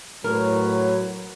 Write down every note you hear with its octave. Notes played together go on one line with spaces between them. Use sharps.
A2 F#3 A#4 B4 C#5